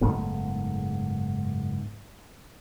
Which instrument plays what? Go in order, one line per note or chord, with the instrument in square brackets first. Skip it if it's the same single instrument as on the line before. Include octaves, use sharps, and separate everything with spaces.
[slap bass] F#1 G#2 A3 B3